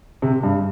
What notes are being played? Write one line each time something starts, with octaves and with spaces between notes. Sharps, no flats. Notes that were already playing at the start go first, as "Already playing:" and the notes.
C3
G2